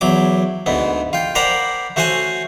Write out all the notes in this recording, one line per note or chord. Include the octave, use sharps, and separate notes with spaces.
E2 F#3 D6
D2 G#2 B3
F4 G5
A#4 C5 D5 F#5 A#5 B5
A3 F#4 C5 C#5 F#5 G#5